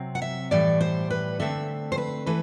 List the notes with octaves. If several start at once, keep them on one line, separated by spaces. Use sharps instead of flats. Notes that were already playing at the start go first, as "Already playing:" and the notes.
Already playing: C3 F#3 C4
F#5
E5
A2 E3 G3 D5
C5
B4
D3 A3 C4 E5
C5
B4
E3 A3 B4